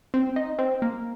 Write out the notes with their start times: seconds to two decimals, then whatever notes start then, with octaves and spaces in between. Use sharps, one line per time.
0.14 C4
0.36 D#4
0.59 C4
0.82 A#3